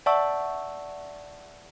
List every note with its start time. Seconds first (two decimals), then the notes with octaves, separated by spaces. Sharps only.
0.06 D5 E5 F#5 A5 C#6 E6